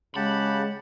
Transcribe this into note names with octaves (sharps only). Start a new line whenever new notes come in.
C#3 G#3 G4 F#5 A5 B5